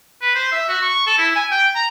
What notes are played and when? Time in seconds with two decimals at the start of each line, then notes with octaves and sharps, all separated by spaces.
0.22 B4
0.35 C5
0.52 E5
0.69 F#4
0.82 C#6
1.07 A4
1.18 E4
1.36 G#5
1.51 G5
1.75 A#5